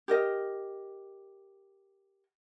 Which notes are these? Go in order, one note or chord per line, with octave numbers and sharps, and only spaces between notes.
G4 A#4 D#5